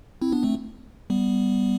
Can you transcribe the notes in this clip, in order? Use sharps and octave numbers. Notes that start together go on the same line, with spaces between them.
C4 E4
B3 D4
A3 C4
G3 B3